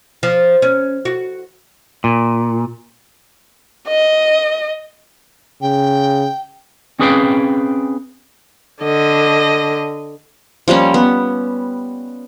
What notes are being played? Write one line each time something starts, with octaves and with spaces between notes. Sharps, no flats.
F3
C#4
F#4
A#2
D#5
C#3 G5
C4 C#4 G#4 B4 F5 G5
D3 D#5
F3 G3 A#3 C#4
B3